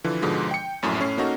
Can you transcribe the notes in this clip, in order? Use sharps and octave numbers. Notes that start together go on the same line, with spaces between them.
D3 E3 F3
G#2 B2 D3 F3 G#3
G5 C#7
A#1 F#2 A2
A2 A3 C#4 C7
A#3 C#4 D#4 F#4 A4 A#4